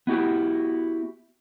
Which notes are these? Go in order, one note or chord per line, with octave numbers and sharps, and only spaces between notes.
B3 E4 F#4 G4